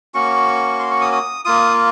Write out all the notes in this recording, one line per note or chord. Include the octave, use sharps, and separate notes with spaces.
A#3 C#4 F#4 C#6
C6
C#6
D#6
D#6
A#3 F4 D#6